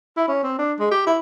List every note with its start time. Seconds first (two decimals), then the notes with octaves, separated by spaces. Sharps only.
0.17 E4
0.28 C#4
0.43 C4
0.58 D4
0.79 G#3
0.92 G4
1.06 E4